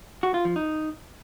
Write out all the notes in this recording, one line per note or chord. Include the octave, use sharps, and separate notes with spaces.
F#4
F4
F3
D#4